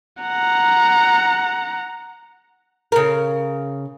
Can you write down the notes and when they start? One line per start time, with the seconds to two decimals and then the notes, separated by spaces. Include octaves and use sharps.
0.21 F#5 A#5
2.92 C#3 A#4